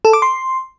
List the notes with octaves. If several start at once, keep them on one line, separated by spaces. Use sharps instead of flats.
A4
D6
C6